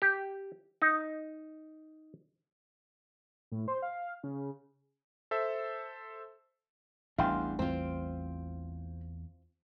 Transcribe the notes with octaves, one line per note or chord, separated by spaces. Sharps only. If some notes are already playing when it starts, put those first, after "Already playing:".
G4
D#4
A2
C5
F5
C#3
A4 C5 E5
A1 E2 A2 G3 D4 F5 G5 C6
E2 C4 F4 C5